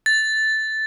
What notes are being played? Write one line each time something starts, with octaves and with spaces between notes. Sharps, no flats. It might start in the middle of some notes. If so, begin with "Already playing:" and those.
A6